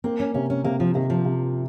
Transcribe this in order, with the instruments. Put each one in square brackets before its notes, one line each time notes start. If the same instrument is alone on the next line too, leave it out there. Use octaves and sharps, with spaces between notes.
[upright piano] A#3 [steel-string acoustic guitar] C4
[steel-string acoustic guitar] C#4
[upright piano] C3 [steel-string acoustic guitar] C#4
[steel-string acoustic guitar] C#4
[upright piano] C3 [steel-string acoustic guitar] A#3
[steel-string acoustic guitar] F3
[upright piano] C3 [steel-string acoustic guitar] D#3
[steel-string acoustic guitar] F3
[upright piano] C3